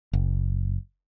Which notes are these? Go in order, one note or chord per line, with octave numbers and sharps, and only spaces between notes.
F#1